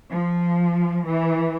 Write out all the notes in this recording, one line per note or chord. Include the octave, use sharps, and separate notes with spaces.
F3
E3